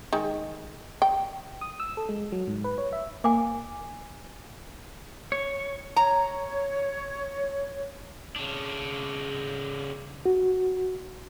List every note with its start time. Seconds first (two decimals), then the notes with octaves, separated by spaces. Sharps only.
0.13 D#3 G#3
1.02 G5
1.61 D#6
1.80 E6
1.97 A4
2.09 G#3
2.32 F#3
2.47 G#2
2.64 B4
2.78 C#5
2.93 E5
3.24 A#3 G#5 D6
5.32 C#5
5.96 C#5 A#5
8.36 C#3 D4
10.26 F#4